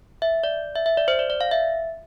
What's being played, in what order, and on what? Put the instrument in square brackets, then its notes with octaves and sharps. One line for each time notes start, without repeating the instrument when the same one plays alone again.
[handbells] E5
D5
E5
E5
D5
C5
D5
D5
F5
E5